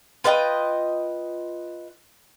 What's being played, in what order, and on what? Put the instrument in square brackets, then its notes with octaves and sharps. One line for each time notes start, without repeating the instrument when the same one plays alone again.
[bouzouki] F4 B4 D#5 G5